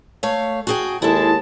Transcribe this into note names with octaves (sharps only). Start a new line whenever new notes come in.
A3 C#5 F5
F#4 G#4 G5
D#2 G#3 E4 A4 A5